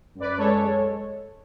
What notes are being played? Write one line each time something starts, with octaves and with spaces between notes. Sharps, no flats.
F#2
B4 D5
G#3 A4 C#5
G#3